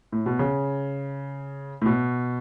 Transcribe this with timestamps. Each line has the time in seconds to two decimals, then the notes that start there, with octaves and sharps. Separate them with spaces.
0.12 A2
0.26 B2
0.39 C#3
1.82 A2
1.86 B2